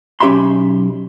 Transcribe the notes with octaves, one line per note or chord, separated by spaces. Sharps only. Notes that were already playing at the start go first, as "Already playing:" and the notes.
B1 C#4 G4 E5 B5 C6